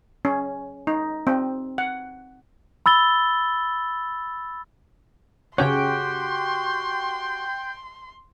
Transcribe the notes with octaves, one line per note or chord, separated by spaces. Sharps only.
C#4
D#4
C4
F#5
B5 E6 A6 G7
C#3 C#4 F#4 G4 C#5 G5 C6